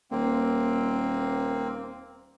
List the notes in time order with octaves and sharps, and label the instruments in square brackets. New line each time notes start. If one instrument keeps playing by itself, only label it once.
[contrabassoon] D#1 [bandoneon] A#3 C4